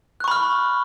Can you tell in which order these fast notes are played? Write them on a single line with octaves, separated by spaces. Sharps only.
F#6 C#6 B5 F6